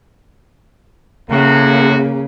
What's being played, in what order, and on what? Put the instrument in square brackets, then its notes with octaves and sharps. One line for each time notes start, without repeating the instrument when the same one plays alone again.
[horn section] F#2 A2 F#4 [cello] C#3 [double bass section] A#3